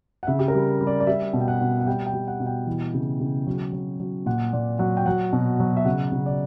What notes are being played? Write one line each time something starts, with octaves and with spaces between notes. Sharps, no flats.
F#5
C#3 E5
G4
A#4
G3
G3
D5
D5
G3 E5
B2
G5
F#5
B2
F#5
G3 G5
G5
G3
F#5
B2
G5
E3
C#3
C#3
F#3
F#3
F#3
A#2 F#5
A#2 D5
F#3 F#5
G5
F#3 F#5
B2
F#3
E5
C#3 F#5
C#3
D5